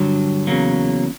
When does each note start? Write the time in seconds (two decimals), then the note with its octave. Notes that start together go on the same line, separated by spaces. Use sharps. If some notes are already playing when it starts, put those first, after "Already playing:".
Already playing: G2 D3 F#3
0.47 E2 C#3 F#3 A#3